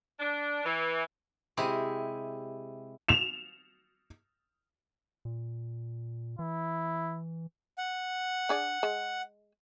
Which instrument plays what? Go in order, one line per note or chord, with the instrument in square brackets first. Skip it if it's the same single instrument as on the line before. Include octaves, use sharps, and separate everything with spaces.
[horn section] D4
E3
[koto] C3 G#3 E4 G4
[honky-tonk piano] E7 F7
[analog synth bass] A#2
[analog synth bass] E3 [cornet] E4
[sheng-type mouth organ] F#5
[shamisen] D4 G#4 D5
G#3